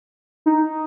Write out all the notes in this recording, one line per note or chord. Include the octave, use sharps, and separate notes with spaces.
D#4